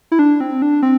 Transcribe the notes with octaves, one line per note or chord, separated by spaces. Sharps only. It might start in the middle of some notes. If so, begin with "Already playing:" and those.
E4
D4
C4
D4
C4